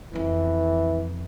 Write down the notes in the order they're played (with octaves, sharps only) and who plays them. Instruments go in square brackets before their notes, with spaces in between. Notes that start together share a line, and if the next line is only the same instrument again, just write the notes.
[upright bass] F2 C#4 [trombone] E3